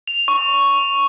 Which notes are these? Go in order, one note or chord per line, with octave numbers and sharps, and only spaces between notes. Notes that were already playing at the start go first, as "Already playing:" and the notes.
F7
C#6